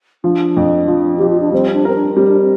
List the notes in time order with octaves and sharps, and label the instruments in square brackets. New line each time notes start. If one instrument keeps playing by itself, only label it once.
[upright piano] F3 [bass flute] D4
[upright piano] F2
F3
[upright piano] F3 [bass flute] G4
[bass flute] F4
D4
[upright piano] G3 [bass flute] C4
[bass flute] D4
[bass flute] C4 [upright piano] A#4
[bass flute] D4
[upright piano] G3 [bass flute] C4
[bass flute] D4
C4